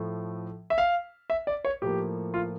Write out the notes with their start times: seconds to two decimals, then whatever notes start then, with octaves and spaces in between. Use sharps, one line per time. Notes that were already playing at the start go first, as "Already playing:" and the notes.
Already playing: A2 F3 A3
0.70 E5
0.78 F5
1.30 E5
1.47 D5
1.65 C#5
1.82 A2 F3 A#3 G4
2.34 F4